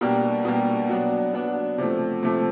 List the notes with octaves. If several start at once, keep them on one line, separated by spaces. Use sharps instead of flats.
B2 G3 A#3 D4 G4
B2 G3 A#3 D4 G4
F#3 B3 D4
F#3 B3 D4
C3 F3 A3
C3 F3 A3